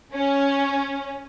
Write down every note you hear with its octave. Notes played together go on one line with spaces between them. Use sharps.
C#4